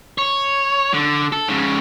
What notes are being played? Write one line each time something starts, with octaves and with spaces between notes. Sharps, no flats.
C#5
D3
A4
G#2 C#3